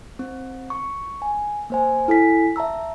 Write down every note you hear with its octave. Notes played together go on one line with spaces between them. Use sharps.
C4
C#6
G#5
A#3 C5 G#5
E4 A4 G#5 B6
E5 A5 A#5 E6